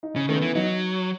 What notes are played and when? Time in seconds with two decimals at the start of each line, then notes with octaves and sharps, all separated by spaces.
0.03 D#4
0.16 C#3 C#4
0.29 D#3 A3
0.35 B3
0.42 E3
0.55 F#3 D#4